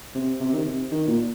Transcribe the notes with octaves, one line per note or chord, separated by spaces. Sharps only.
C3
C3
D#3
C3
D#3
A#2